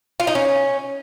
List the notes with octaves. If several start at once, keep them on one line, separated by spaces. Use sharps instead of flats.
F4
D#4
C#4